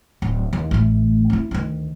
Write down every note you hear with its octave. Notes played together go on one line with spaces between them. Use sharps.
D1
D#2
A1 A3
C4 E4
D2 D#3